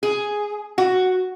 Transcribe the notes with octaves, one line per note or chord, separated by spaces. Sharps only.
G#4
F#4